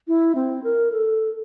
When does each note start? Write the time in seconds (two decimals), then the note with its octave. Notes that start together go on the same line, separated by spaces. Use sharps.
0.08 E4
0.35 C4
0.64 A#4
0.92 A4